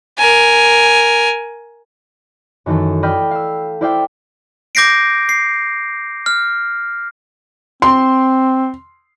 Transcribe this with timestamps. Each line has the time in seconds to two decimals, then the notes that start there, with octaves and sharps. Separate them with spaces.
0.18 A#4 G#5
2.66 F#2 D#3 E3 A3 A4
3.03 D5 D#5 G5 B5 F6 G6
3.31 F5 E6
3.81 E4 C5 D5 E5 F5 G5
4.75 D6 G6 A#6 C7 D7
5.29 C7
6.26 F6
7.82 C4 C6